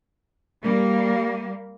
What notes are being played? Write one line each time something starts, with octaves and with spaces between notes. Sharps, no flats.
G3 A#3